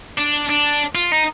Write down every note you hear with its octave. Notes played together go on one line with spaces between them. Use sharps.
D4
D4
F4
D#4